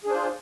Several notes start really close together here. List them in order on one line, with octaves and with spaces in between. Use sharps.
G#4 D4 C5 F4